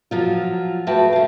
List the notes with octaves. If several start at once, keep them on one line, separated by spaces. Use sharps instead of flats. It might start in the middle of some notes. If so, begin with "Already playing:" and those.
F3 F#3 F4
A3 F#4 G#4 B4 G5 A5
D3 F5